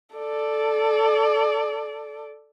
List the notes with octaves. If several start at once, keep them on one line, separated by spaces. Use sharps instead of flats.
A4 D5